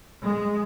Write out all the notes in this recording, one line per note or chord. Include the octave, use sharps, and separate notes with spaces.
G#3